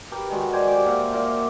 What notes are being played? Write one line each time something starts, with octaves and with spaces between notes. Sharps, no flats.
G4 A#4 B4
D#3 G#3 F#4
C5 D5 G#5
G4 D6
A#3 E5 F#5
A#2 A#3